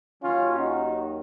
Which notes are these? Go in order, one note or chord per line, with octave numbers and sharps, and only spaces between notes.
D#2 D#3 F#3 C#4 F4
D#4 F#4